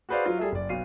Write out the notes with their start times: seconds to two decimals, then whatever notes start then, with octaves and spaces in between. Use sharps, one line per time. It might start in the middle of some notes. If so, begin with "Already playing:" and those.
0.09 F#4 G#4 B4 C5 D5 F5
0.26 F#3 F4
0.38 G3 G#4 A4 E5
0.52 F#1 D5
0.69 B1 B2 F5 C7 D#7